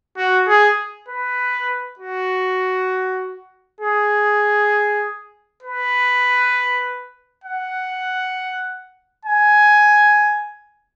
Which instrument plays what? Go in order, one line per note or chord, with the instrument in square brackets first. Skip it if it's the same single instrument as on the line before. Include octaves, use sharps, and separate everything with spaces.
[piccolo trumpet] F#4
G#4
B4
F#4
G#4
B4
F#5
G#5